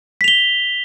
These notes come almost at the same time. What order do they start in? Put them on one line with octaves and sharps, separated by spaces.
B6 F7 G7